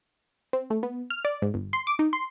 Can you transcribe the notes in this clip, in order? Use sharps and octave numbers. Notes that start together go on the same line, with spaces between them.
C4
A3
B3
F6
D5
G#2
G1
C6
D6
D#4
C6